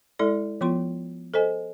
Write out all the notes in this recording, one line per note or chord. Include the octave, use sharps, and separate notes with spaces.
G#3 E4 A4 D5
F3 B3 F4 C6
A4 C5 D#5 G#5